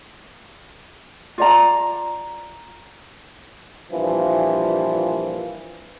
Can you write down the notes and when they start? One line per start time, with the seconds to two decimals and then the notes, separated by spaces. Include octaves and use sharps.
1.38 F4 D5 A#5
3.92 G2 A#2 E3 F3